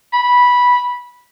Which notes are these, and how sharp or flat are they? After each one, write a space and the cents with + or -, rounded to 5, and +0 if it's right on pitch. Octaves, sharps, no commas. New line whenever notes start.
B5 -10